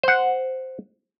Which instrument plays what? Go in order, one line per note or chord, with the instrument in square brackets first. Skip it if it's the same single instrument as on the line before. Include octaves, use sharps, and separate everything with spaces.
[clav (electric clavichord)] C5 F#5